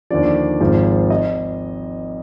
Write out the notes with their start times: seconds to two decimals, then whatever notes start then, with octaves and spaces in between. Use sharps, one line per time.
0.10 D#2 D3 F3 D5
0.60 G#1 G#2 F3
1.10 D#5